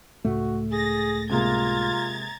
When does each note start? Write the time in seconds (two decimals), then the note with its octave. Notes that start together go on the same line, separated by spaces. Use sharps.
0.25 C#2 A2 A3 F#4
0.71 G#4 A6 A#6
1.30 C3 G#3 A#3 F4 A#5 G#6 A6